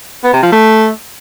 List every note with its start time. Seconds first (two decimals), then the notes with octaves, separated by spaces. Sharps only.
0.24 B3
0.33 C3
0.43 F3
0.52 A3